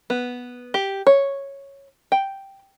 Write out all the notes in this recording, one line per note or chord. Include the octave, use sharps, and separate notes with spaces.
B3
G4
C#5
G5